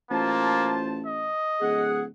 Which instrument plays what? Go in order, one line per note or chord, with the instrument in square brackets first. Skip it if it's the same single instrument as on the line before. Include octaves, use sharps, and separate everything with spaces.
[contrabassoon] A1 [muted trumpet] A#3 [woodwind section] F4 C5 A5
[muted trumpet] D#5
[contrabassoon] D1 [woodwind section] G#4 F#5